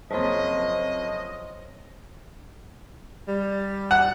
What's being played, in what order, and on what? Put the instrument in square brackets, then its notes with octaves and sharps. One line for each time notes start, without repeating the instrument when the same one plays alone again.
[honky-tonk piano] F#1 F2 [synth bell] C5 C#5 C6 [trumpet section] D#5
[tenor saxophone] G3
[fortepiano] F#5